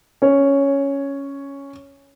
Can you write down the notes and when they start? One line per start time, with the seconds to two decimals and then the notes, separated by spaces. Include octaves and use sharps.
0.22 C#4 C#5